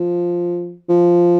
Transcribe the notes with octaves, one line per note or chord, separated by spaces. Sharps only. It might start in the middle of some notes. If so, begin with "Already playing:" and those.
Already playing: F3
F3